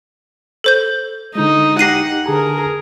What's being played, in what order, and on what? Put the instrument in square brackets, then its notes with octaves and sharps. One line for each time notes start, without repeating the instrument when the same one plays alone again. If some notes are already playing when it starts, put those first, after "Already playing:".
[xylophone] A4 C5 G6
[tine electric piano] D3 G#3 [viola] D#4
[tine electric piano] D#4 G4 [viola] F#5 [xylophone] A#6 C7 D#7
[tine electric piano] D3 A5 A#5 [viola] G#4 A#4